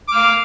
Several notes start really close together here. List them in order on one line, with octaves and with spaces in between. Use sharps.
D6 F6 F5